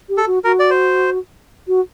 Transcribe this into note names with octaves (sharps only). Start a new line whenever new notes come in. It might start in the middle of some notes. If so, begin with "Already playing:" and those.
G4
A4
F#4
F#4 A#4
D5
C5
F#4